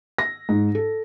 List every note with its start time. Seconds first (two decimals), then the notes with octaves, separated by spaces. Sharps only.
0.18 A#6
0.49 G#2
0.75 A4